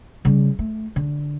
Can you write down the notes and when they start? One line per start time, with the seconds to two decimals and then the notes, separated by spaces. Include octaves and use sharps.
0.25 C#3 G3
0.59 A3
0.96 D3